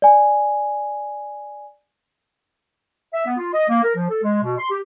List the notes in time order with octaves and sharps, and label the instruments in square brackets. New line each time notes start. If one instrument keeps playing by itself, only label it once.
[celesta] D5 G#5
[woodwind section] E5
B3
F4
D#5
A#3
A#4
F3
A4
G#3
B2
C6
G4